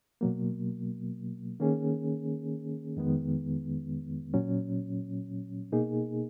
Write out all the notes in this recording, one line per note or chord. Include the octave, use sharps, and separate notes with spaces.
B2 F#3 A#3
D#3 A#3 C#4 G#4
F2 D#3 G#3 B3
A#2 F#3 C#4
B2 A#3 D#4 G#4